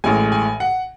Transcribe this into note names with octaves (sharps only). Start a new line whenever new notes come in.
A1 A2 E3 G#3 G#5
G#5
F#5